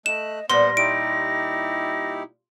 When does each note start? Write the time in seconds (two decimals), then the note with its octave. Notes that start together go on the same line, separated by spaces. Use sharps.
0.06 A3 D#5 F#6 E7
0.50 A#2 G3 B3 C5 F#5 C6 A#6
0.77 D#4 E4 G4 D7